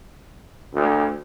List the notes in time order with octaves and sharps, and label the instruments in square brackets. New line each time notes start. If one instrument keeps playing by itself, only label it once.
[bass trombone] D2